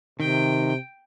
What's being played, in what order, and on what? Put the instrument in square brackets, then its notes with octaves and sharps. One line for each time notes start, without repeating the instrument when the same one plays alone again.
[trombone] C3 [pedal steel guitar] D#3 [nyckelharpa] G5